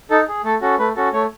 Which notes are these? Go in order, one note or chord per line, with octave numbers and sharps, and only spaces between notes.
D#4 A4
G#4
A3 A4
C#4 F#4 A4
A3 B4
C#4 F#4 A4
A3 C#5